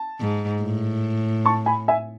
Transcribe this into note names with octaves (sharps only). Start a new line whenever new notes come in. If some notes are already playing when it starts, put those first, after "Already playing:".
Already playing: A5
G#2
A2
A5 C#6
G#5 B5
E5 G#5